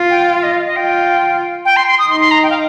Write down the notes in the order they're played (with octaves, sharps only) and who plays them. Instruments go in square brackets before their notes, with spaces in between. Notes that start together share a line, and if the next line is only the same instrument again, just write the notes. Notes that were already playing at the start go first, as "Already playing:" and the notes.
Already playing: [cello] F4
[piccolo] G5
F5
D#5
F5
D#5
[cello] F4 [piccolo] G5
[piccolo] G5
C6
C6
D#6
[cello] D#4 [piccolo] C6
[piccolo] C6
A#5
G5
F5